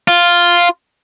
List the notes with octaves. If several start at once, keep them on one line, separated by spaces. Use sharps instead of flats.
F4